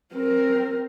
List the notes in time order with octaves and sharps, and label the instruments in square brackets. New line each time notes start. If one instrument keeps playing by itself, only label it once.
[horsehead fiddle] C4 A#4